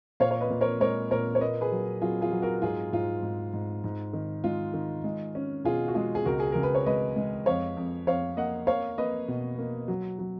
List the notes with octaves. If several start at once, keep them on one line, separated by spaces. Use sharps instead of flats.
A#2 C#5 F5
C#5
B4 D#5
A#2
A#4 C#5
G#3 A#4 C#5
A#2 A#4 C#5
C#5
A#3 B4 D#5
G#4 B4
F#3
F#3 F4 G#4
F4 G#4
F#3
F#4 A#4
G#2 F4 G#4
G#2 F4
G#2
G#2
G#2
D#3
G#3 F4
D#3
G#3
C#4
B2 F4 G#4
F#4
G#3 F4 G#4
G#4
C#2 F#4 A#4
G#4
C#2 A#4
B4
C#5
G#3 B4 D#5
G#3
F2 C#5 F5
F2
F2 C#5 F5
A#3 D#5 F#5
A#3 C#5 F5
A#3 B4 D#5
B2
A#3
F#3
F#3